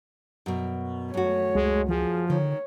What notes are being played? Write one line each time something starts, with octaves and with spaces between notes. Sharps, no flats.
F#2 B2
F#2 A3 F#4 C#5
C#2 G#3
F3 F4 G#4
D3 D#3 C#5